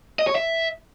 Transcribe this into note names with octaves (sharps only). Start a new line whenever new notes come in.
D#5
C#5
E5